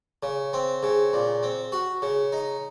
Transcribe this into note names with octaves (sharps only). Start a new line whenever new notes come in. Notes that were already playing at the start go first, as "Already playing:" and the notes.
C#3
C4
C#3
A#2
C4
F#4
C#3
D#4